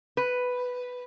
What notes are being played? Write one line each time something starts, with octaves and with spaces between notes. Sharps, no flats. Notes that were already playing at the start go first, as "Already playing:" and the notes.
B4